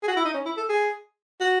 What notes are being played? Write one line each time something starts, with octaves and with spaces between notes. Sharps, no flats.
G#4
F#4
E4
D#4
C#4
E4
A4
G#4
F#4